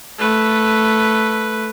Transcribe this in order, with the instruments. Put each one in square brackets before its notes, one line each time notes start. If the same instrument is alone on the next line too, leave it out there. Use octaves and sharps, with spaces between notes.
[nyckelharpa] A3 B4